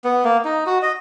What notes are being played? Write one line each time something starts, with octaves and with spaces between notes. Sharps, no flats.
B3
A#3
D#4
F#4
D#5